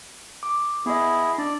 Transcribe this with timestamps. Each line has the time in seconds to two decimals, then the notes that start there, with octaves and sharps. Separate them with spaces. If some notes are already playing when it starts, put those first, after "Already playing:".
0.43 D6
0.86 B3 E4 G#4 D#5
1.04 D#5
1.38 D4 D5